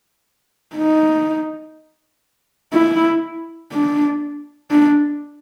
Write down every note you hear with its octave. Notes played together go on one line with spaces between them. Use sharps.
D#4
E4
D4
D4